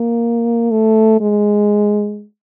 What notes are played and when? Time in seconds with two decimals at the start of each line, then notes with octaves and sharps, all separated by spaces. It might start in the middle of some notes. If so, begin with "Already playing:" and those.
Already playing: A#3
0.71 A3
1.20 G#3